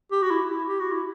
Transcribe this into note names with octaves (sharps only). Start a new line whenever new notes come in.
G4
F#4
E4
E4
G4
F#4
E4